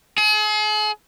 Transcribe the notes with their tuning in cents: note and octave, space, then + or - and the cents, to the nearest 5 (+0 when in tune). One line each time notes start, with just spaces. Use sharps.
G#4 +40